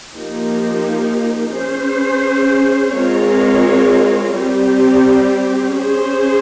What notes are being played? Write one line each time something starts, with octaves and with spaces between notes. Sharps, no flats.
F3 A#3 D#4 G4
C#4 G#4 C5
G#3 C4 F4 A#4 C#5
G3 C4 G4
C#4 G#4 C5